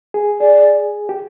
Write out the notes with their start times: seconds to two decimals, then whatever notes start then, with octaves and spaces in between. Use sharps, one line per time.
0.14 G#4
0.41 G#4 D5
1.09 G4